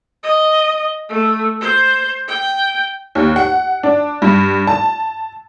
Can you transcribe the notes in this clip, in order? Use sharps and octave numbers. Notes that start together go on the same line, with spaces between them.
D#5
A3
C5
G5
D#2
F#5
D4
G2
A5